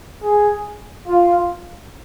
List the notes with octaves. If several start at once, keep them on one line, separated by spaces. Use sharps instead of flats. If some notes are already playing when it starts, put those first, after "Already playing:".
G#4
F4